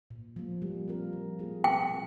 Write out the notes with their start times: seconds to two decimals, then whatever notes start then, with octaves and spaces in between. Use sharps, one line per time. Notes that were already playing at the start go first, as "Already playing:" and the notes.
0.11 A#2
0.36 F3 A#3
0.62 G3
0.88 C4 F4 A#4
1.13 F3
1.39 A#3 F4 G#4
1.64 A#2 G5
1.91 G3 C4